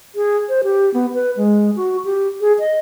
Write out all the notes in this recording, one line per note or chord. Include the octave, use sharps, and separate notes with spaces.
G#4
C5
G4
B3
B4
G#3
F#4
G4
G#4
D#5